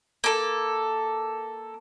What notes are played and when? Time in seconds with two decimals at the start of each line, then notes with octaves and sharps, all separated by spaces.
0.24 A#3 A4